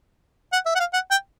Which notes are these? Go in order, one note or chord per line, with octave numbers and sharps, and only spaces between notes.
F#5
E5
F#5
F5
F#5
G5